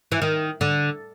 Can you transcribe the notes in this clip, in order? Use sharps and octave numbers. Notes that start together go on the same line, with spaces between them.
E3
D#3
D3